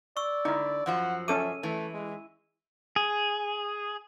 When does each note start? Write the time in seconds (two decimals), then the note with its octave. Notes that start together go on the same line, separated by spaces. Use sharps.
0.17 D5 C#6 E6
0.45 D3 D#4 E4
0.86 F#2 F3 F#4 F#5
1.28 C#4 A4 E5 D6 D#7
1.63 E3 A3
1.94 G#3
2.96 G#4